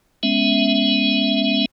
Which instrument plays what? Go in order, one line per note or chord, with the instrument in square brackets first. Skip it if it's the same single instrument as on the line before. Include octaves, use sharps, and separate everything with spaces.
[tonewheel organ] G#3 B3 C#4 E5